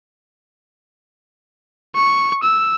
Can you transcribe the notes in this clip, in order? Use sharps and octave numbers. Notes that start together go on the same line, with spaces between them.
C#6
E6